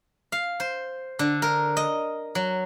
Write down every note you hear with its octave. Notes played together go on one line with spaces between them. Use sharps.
F5
C5
D3
A#4
D#5
F#3